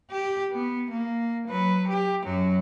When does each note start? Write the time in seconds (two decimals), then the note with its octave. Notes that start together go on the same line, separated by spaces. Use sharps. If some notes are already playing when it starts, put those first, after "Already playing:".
0.10 G4
0.52 B3
0.91 A#3
1.48 F#3 B4
1.88 G4
2.24 F#2 F#3